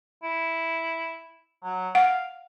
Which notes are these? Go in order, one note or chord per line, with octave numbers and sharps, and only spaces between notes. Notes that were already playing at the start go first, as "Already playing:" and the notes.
E4
F#3
F5 F#5